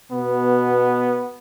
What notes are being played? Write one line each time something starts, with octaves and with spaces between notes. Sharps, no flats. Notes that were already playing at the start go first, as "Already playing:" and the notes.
B2 B3